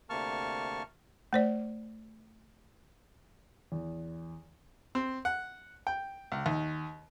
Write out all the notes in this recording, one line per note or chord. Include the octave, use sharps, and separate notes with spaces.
D2 C3 A#3 A5 C#6 F6
A3 C5 D5
E2
C4
F#5
G5
C#2
D#2